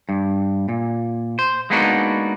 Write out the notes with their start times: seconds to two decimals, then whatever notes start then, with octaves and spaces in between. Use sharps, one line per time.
0.09 G2
0.69 A#2
1.39 C5
1.70 G#3 A#3 B3 D4 D#4 F#4